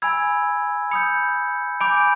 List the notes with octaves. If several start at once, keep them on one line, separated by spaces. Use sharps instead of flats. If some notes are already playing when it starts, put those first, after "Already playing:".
G#5 B5 E6 G#6
B5 D#6 G6 C#7
G#5 B5 D6 G6 D7